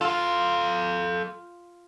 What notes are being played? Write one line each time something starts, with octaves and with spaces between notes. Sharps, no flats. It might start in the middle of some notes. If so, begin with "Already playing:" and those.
F4 A4 F5